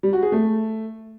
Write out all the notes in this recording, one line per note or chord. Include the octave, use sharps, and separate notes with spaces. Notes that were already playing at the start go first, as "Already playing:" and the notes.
G3
F#4
G#4
A3